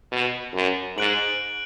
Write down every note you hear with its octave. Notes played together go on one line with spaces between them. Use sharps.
B2
F#2
G#2 F#6 D7 F#7